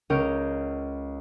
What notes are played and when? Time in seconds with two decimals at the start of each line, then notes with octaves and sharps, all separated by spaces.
0.10 C#2 C#4 A#4 G6 D7